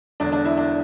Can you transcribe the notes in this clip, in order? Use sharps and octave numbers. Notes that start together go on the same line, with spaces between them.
E1 E2 D3 D4
D4
E4
D4